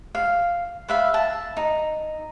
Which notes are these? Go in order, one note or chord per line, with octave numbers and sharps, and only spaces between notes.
F5
B4 E5 F5
A5
D#4